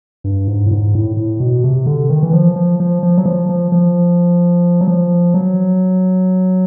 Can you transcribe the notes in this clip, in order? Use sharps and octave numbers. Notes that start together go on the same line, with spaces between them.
G2
G#2
A2
G#2
A2
A2
B2
C3
D3
D#3
E3
F3
F3
F3
F3
F#3
F3
F3
F3
F#3
F3
F#3